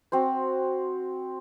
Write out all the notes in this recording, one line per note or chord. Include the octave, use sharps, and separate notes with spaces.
C4 F#4 C5